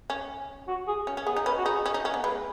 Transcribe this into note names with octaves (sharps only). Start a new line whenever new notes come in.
C#4
F#4
G#4
C#4
C#4
B3 G#4
D#4
C#4 B4
F#4
D#4 G#4
C#4
D#4
C#4
B3
G#3 B4